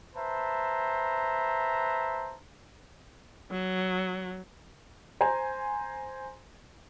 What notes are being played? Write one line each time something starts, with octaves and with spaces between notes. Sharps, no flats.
B4 C5 E5 A5 A#5
F#3
C5 G#5 A#5